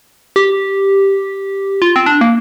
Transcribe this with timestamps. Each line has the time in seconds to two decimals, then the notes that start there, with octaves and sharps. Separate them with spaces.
0.36 G4
1.82 F4
1.96 C4
2.06 D4
2.21 A#3